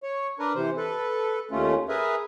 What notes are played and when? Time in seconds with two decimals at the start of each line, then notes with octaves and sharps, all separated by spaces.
0.03 C#5
0.39 D4 A#4 B4
0.55 C3 E3 C5
0.77 A4 B4
1.51 D#2 A3 C#4 F4
1.89 G#4 A#4 B4 E5